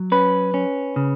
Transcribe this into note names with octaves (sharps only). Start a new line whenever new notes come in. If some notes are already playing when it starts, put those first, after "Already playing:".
Already playing: F#3
C#4 B4
C#4
C#3